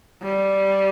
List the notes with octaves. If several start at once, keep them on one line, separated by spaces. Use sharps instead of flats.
G3